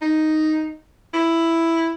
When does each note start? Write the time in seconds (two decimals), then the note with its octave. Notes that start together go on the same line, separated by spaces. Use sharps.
0.01 D#4
1.14 E4